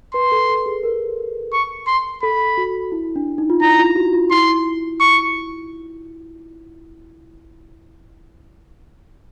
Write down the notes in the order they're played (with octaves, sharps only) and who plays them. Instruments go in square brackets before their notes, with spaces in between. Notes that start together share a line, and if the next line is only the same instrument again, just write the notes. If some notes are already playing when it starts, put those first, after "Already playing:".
[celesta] B4 [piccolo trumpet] C6
[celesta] A4
A4
G#4
A#4
[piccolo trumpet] C#6
C6
[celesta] A4 [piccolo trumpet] B5
[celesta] F#4
E4
D4
D#4
F4
[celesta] E4 [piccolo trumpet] A#5
[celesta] F4
F#4
F4
[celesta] E4 [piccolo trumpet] C6
[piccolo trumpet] C#6